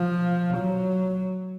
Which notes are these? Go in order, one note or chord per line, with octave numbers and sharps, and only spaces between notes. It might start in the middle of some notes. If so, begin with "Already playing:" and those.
Already playing: F3
F#3